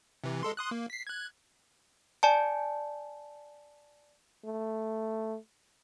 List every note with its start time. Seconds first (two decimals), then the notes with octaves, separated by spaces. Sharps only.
0.24 C3 E3
0.43 G#3 A4 C6
0.57 C6 D#6 F#6
0.71 A#3
0.90 B6 C7
1.07 F#6 G#6
2.23 D5 G#5 A5
4.45 A3